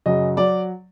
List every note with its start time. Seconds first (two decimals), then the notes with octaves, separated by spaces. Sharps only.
0.06 F#2 C#3 F#3 D#5
0.37 F#3 D5